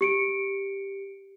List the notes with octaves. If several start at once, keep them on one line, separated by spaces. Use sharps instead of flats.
G4 C#7 D7